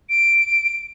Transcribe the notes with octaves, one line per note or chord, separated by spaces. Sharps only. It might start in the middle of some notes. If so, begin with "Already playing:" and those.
D7